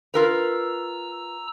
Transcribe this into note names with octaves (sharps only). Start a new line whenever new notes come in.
F4 A#4 B4 A#5 E6